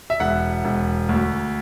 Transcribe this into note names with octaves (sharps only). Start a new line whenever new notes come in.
E5
E1 F#5
E1
D2